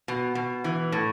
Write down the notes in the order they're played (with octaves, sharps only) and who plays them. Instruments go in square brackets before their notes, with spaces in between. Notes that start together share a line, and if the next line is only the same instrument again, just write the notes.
[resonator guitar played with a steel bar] B2
B2
E3
A2